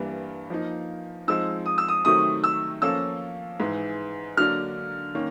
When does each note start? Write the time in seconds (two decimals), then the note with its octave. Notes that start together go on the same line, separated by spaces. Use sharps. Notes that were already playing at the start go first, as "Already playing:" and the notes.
Already playing: G2 E3 G3 A#3 D4
0.50 F3 A#3 D#4
1.28 F3 G#3 C4 D#4 E6
1.66 D#6
1.78 E6
1.88 D#6
2.05 C3 D#3 F#3 A3 C4 D#6
2.44 E6
2.82 F3 A#3 C#4 F4 A4 E6
3.60 G#2 E3 G#3
4.37 D3 F#3 A#3 D4 F6
5.15 D#3 A#3 C#4